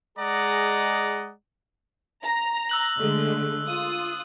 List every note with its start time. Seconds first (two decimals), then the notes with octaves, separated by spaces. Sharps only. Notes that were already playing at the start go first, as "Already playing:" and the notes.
0.18 G#3 G#4 D5 D#5 F#5 A#5
2.23 A#5
2.69 E6 F#6 F#7
2.98 D3 G#3 A3
3.68 F4 D#6